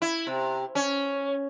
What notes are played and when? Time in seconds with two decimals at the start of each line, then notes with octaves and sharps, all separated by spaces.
0.02 E4
0.27 C3
0.75 C#4